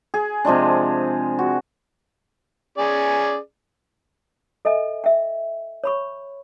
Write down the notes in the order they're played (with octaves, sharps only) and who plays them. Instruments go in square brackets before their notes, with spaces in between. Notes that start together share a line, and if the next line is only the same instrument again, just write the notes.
[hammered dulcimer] G#4
C3 F3 G#3 D4
F#4
[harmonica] C#4 G#4 D5
[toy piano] A4 D#5 E5 G#5
E5 G5
C#5 B5 C#6